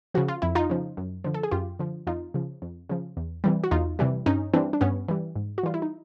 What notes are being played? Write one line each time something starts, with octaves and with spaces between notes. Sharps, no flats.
C#3 F3 F#4
F4
F2 E4
D#4 F4
C#3 F3
F#2
D3 F3
A4
G#4
F#2 F4 G4
D3 F3
F2 D#4 F4
C#3 F3
F2
C#3 F3
E2
C3 E3 G3
F#4
E2 D#4 F4
C3 E3 G3
G2 C#4 D#4
E3 G3 C4 D4
D4
G2 B3 C#4
E3 G3
G#2
F#4
E3 G3 F4
E4
D#4